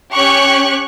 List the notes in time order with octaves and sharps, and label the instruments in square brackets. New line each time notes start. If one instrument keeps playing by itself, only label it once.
[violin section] C#4 G4 C#6 F#6